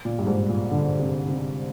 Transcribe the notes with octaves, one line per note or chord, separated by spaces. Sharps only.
A#2
G2
G#2
A#2
D3
C3
C3